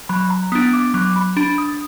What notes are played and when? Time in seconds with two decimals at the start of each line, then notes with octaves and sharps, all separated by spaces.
0.09 F#3 B5
0.30 A#5
0.52 B3 D4 D#6
0.73 D6
0.94 F#3 D6
1.16 B5
1.37 D4 B5
1.58 D#6